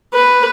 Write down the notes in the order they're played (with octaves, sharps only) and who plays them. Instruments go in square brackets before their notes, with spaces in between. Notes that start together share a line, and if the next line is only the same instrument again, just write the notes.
[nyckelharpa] B4